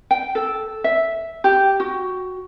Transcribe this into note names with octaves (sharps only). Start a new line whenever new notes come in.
G5
A4
E5
G4
F#4